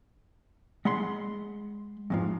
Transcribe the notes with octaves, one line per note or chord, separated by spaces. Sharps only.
G#3 F#5 B5 C6
F2 G#2 F3